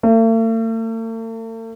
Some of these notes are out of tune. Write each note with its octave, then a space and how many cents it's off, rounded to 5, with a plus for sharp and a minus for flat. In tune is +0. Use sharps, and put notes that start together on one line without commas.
A3 +45